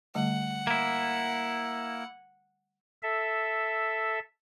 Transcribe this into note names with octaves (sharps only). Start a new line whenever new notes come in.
D3 G3 A3 F#5
A#3 E4
A4 E5